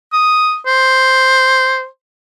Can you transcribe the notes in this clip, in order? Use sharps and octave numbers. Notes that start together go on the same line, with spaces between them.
D#6
C5